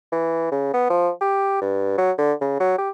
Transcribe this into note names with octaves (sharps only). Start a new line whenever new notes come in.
E3
C#3
B3
F3
G4
G2
F#3
D3
C#3
F#3
G4